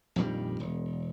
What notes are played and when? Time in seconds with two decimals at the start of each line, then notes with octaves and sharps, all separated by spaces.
0.16 A#1 F2 D#3 G3
0.60 E1